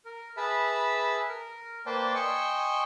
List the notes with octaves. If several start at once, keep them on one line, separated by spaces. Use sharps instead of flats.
A#4
G#4 B4 E5 A5 B5 E6
A#4
A#3 B4 C5 D5 G5 A5
D#5 G5 G#5 C6 C#6 E6